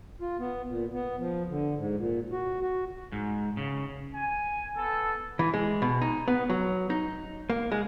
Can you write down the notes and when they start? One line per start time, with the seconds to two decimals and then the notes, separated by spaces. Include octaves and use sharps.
0.21 F4
0.39 B3
0.67 A#2
0.93 B3
1.19 F3
1.49 D3
1.75 G#2
1.97 A#2
2.32 F#4
2.61 F#4
3.12 G#2
3.57 C#3
4.15 G#5
4.76 B3 A4
5.39 E3
5.54 G#3
5.82 B2
6.01 D#4
6.28 B3
6.50 F#3
6.90 D#4
7.50 A#3
7.72 G#3